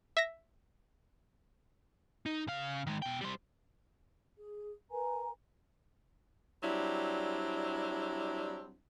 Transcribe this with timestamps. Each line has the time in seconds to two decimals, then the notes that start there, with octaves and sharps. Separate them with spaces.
0.17 E5 A#6
2.26 D#4
2.47 C#3 F5
2.87 D#3 G#3
3.02 B2 G5
3.21 G3 C5
4.38 G#4
4.91 A#4 B4 G#5 A#5
6.63 F#3 G3 C4 D4 E4